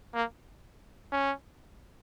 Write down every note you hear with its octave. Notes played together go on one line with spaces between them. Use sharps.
A#3
C#4